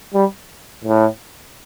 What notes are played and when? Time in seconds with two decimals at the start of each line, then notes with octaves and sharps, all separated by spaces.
0.14 G3
0.84 A2